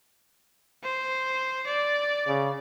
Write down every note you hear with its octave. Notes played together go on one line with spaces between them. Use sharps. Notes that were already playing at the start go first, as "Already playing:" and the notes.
C5
D5
C#3